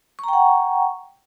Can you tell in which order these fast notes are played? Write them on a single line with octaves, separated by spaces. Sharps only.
C#6 A#5 G5 F#5